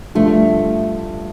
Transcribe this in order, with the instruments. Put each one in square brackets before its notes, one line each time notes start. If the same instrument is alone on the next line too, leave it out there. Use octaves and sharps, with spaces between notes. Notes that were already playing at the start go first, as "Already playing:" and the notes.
[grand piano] G2 D3 F3 [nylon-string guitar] A3